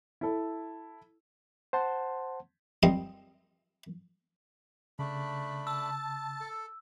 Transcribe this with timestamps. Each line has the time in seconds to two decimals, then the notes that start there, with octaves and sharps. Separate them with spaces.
0.21 E4 A4
1.73 C5 F#5 A5 C6
2.83 F3 G3 C4 F4 A#4 D#5
4.99 C#3 A3 D4 B5
5.67 A5 E6
6.40 A4